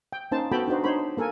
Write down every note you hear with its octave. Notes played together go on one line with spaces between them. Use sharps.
G5
A#3 C#4 D#4 C5 A5
B3 F#4 A4 G5 A5 B5
D4 D#4 F#4 C5
D4 D#4 C5 C#5 B5
A#3 A4 A#4 G#5